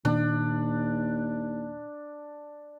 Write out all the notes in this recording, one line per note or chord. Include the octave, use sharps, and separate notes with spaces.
D#2 A#2 D#3 C4 D4